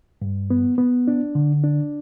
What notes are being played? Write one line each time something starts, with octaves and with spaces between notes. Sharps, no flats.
G2
B3
B3
D4
D3
D4